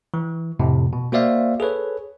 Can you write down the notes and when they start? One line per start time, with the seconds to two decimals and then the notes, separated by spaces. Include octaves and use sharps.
0.14 E3
0.59 F2 A2 C3
0.93 B2
1.12 A#3 F#4 C5 D5 E5 F5
1.60 G#4 A4 B4 C#5